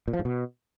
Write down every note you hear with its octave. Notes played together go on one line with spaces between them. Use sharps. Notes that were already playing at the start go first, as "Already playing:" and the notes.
A#2
F3
G#2
B2